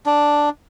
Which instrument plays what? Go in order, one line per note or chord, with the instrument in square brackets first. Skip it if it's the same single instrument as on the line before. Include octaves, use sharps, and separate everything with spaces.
[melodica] D4